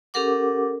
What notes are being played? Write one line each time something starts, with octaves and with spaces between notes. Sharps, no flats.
C#4 G4 A4 A#4 F#5 D6